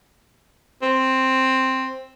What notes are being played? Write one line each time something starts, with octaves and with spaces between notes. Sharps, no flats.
C4